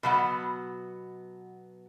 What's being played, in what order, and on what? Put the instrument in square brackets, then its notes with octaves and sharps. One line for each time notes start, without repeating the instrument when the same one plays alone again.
[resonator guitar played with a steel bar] B2 F#3 B3 F#5